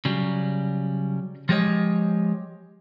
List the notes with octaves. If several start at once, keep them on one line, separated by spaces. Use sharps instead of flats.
C#3 F#3 G3
F3 G#3 G4 G#4 C#5 D#5